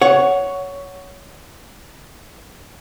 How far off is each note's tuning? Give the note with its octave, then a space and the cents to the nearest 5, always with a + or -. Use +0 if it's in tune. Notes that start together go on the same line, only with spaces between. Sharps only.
C#5 +15 F#5 +0